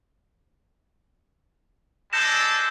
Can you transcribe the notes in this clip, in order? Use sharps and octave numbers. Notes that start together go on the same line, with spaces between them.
G#3 D4 A4 G6 A#6 E7